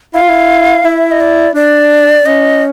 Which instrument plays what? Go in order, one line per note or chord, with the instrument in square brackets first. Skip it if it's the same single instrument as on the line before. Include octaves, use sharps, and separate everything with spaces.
[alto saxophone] E4 [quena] F5
[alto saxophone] F4
E4
[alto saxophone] E4 [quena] E5
[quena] D#5
D5
[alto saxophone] D4 [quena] D5
[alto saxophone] C#4 [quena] D#5